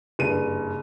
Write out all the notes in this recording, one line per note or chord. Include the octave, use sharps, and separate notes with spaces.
F#1 G2 D#7